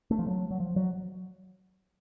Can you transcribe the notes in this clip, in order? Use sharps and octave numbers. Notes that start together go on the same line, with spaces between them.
A3
F3
F#3
F#3
F3
F#3